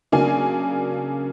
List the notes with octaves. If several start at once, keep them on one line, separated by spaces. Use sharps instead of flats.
C#3 F#3 A#3 D4 G#5